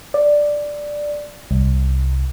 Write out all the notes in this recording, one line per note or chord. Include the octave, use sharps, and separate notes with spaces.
D5
C2